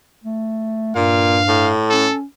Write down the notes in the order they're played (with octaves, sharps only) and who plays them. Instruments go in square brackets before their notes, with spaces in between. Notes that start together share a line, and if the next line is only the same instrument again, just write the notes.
[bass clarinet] A3
[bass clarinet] G2 [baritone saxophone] A#2 [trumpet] F5
[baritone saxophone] A2
[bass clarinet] C#4 [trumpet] A4